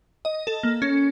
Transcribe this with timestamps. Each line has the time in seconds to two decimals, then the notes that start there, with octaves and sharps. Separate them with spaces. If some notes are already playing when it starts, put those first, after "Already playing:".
0.25 D#5
0.47 A4
0.63 A#3
0.82 C#4